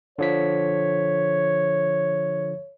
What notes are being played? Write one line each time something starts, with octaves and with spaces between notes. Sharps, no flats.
D3 F3 C#5 B6